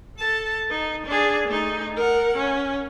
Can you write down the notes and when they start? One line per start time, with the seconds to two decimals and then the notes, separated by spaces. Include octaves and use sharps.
0.18 A4 A5
0.70 D#4
1.06 D4 G#4
1.48 A3 D#4
1.97 A#4 F#5
2.37 C#4